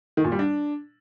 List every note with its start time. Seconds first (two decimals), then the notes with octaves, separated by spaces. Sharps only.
0.17 D#3
0.24 A#2
0.32 G3
0.39 D4